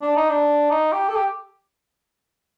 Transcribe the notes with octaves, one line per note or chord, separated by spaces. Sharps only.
D4
D#4
D4
D#4
G4
A4
G4